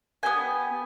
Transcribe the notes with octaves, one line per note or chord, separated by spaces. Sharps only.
B3 E4 G4 G#5